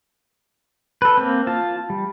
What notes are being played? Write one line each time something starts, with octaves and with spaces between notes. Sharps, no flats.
A4 B4
A#3 C4
F4 A5
G3